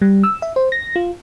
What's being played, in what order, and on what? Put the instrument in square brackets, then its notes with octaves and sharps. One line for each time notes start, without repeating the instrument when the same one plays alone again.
[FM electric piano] G3
E6
E5
C5
A#6
F4